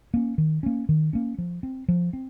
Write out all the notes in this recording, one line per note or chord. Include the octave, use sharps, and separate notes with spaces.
A#3 C#4
D#3
A#3 C#4
D#3
A#3 C#4
F3
C4
F3
C4